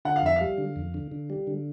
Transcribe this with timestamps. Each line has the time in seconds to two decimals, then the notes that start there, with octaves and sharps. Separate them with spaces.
0.05 D3 F#5
0.16 F5
0.22 F2 E5
0.36 G3 F5
0.58 D3
0.76 F2
0.94 D3
1.12 D3
1.30 G3
1.47 D3